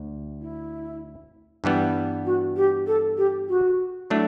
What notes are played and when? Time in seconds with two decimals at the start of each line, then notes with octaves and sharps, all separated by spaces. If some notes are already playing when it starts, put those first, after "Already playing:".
Already playing: D2
0.41 E4
1.64 G2 E3 G3 B3
2.25 F#4
2.56 G4
2.86 A4
3.17 G4
3.48 F#4
4.10 F#3 A3 D4 E4